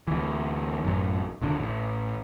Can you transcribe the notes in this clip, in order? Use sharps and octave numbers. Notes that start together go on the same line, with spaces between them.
D2 E3
A1 F#2
D#1 D#2 D3
A1